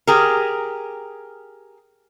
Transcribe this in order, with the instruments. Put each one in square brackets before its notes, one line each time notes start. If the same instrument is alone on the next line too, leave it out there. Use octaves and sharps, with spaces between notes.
[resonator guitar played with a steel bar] G4 G#4 A#4